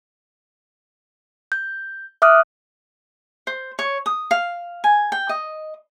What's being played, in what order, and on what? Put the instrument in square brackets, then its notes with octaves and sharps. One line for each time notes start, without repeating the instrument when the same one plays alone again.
[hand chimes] G6
E5 D6 D#6 F6 F#6
[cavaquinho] C5
C#5
D#6
F5
G#5
G5
D#5